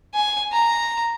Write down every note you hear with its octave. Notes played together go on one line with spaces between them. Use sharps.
G#5
A#5